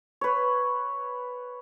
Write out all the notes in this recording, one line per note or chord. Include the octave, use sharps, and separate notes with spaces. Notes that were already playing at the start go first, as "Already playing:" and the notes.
B4 C#5